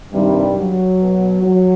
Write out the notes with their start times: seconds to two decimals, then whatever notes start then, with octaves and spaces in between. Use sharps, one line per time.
0.13 G2 C3 D#3 G3
0.57 F#3
1.00 B2
1.43 F#3